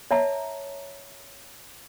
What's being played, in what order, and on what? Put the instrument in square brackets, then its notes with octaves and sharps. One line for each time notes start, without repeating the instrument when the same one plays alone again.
[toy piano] C#5 E5 A5 A#5